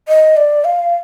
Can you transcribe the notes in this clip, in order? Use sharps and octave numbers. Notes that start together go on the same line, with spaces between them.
D#5
D5
F5